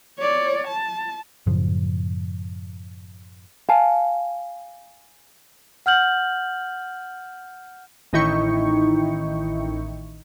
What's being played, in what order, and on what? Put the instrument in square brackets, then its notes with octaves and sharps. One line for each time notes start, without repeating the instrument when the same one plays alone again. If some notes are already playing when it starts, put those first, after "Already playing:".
[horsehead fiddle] C#5 D5
A5
[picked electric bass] F#2 A2 C#3 F3
[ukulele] F5 G#5 A5
[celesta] F#5 F6 G6 F#7
[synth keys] A1 D#3 D#4 E4 G5 C#6